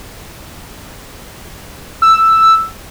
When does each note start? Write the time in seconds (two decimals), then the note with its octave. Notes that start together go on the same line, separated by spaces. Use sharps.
2.02 E6